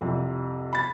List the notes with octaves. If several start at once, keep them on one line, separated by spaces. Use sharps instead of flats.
C2 F2 C3
B5 A6